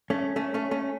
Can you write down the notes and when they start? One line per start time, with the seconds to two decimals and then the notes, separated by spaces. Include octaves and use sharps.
0.10 A3 C#4
0.36 A3 C#4
0.54 A3 C#4
0.71 A3 C#4